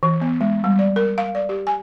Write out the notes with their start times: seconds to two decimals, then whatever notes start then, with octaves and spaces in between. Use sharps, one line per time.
0.03 E3
0.21 B3
0.41 G#3
0.64 G3
0.79 D5
0.96 A#4
1.18 F5
1.35 D5
1.49 G4
1.67 G#5